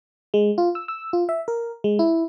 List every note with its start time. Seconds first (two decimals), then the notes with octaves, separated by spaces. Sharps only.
0.34 G#3
0.58 F4
0.75 E6
0.88 E6
1.13 F4
1.29 E5
1.48 A#4
1.84 G#3
1.99 E4